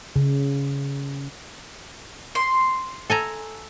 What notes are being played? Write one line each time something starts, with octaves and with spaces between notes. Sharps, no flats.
C#3
C6
A4 G#5 A#5